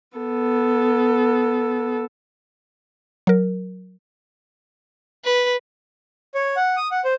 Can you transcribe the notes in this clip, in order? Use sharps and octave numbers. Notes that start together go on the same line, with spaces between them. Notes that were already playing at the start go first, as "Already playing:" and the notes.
B3 A4
F#3 A#4
B4
C#5
F#5
D#6
F#5
C5